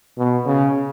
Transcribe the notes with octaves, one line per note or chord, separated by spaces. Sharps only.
B2
C#3